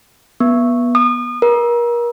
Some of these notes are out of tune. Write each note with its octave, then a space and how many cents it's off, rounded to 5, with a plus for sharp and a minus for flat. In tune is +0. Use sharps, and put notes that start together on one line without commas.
B3 -25
D#6 -35
A#4 +35